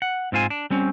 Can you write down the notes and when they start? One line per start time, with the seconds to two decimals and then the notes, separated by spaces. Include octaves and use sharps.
0.02 F#5
0.32 G#2 C4 F4 C5 G#5
0.50 D4
0.70 G3 C4 C#4